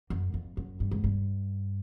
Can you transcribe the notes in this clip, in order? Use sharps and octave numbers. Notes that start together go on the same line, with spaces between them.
F#2
F2
F#2
G2
G#2
G2